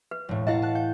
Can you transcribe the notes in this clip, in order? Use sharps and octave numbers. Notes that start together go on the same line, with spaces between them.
B4
E1 A2
E4 D#5 F5 F#5 A5
A5 F#6
G5 G6